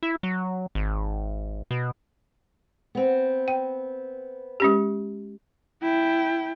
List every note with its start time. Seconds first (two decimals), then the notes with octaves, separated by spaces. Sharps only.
0.03 E4
0.23 F#3
0.75 G#1
1.71 B2
2.95 B3 C4
3.48 G5
4.60 G#3 C#4 G4
5.82 E4 G5